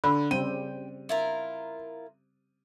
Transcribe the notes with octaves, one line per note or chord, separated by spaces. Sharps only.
D3 B5
C#3 G3 C4 G5 D#7
E4 F4 A#4